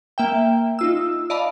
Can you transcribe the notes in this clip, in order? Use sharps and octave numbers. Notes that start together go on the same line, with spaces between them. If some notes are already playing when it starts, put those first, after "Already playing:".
A#3 E5 G5
D#4 F4 E6
D5 D#5 F5 A5 B5